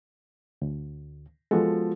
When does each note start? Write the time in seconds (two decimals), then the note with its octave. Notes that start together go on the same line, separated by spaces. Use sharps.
0.62 D2
1.51 F3 G#3 B3 F#4 A4